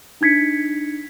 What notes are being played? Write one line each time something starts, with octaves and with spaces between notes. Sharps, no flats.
D4 D#4 G#6 B6 C#7